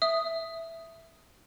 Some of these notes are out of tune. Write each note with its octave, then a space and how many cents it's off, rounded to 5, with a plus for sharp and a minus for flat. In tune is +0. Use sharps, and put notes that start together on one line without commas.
E5 +0 D#6 +0